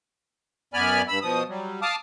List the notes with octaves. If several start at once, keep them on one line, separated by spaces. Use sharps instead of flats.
F#2 B3 D5 G#5 B5 F6
G2 B5 E6
B2 F3 D#6
F#3 G3
F5 A5 D6 D#6 F6